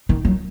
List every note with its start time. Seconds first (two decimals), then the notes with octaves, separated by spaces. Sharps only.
0.09 D#3
0.25 F#3